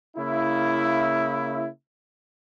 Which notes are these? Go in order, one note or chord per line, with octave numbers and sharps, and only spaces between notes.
C#3 A#3 E4